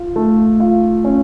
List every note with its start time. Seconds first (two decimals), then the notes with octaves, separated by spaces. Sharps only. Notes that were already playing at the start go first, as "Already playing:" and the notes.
Already playing: F4
0.16 A3
0.60 F4
1.04 C#4